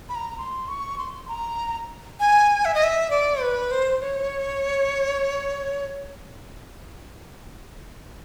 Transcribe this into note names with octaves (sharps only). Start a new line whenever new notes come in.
B5
A#5
C6
C#6
C6
A#5
G#5
E5
D#5
E5
D5
B4
C5
C#5